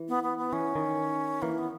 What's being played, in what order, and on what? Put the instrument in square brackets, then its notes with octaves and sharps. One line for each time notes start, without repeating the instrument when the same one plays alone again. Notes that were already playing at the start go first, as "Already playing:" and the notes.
Already playing: [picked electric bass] E3
[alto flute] B3
B3
B3
[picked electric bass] E3 [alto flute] C#4
[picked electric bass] D#3
[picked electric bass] E3 [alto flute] A#3
[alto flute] B3